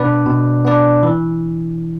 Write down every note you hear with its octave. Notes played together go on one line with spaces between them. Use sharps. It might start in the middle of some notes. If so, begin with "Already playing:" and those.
Already playing: B2 B3 D4 B4 D5
B2
B3 D4 B4 D5
E3